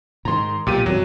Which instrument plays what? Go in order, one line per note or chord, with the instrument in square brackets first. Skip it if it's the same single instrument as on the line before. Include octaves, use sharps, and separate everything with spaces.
[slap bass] G#2 D#3 [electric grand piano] A#5 C6
[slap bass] B1 [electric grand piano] A#2 G4 D#7
[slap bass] G#1 F2 [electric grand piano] F#3